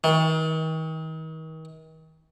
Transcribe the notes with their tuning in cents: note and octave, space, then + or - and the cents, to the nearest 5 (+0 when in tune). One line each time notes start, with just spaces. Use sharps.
D#3 +40